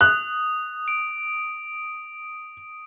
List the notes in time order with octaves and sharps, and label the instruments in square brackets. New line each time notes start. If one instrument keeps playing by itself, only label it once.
[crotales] D#6 [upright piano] F#6
[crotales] D7